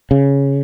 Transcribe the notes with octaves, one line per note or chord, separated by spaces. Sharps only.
C#3